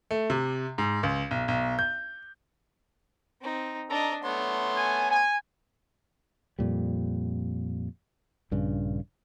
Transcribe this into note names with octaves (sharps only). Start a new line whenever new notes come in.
A3
C3
G#2
C#2
B1
B1
G6
C4 D#4
D4 A4 D#5 A#5
A3 B3 C#5 C6
G#5
G#5
F2 A#2 G3
A#1 G2 C#3